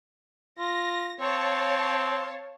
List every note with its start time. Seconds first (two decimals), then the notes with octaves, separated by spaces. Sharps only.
0.59 F4 A#6
1.20 C4 C#5 F5 A5